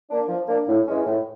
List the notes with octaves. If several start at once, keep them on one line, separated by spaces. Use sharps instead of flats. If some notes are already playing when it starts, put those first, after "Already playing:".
A#3 D4
F3
A#3 D4
A2
E3 G#3 C#4
A2